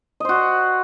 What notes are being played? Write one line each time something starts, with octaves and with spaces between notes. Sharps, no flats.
F#4 C5 D#5